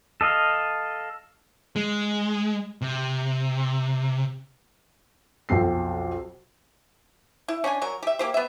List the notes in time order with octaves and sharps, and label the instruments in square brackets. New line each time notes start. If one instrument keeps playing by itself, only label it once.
[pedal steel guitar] A4 D#5 F5
[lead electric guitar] G#3
C3
[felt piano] B1 F2 C4 C7
[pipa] E4
C#4 D4 F#5 G#5
F#3 F#4 A#4
G4 E5
A#3 G4 C5
B3 E5